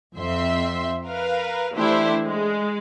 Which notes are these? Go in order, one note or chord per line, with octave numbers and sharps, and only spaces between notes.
F2 C4 E5 C6
A#4 B4 F5
E3 A3 D4 E4 G4 C5
G#3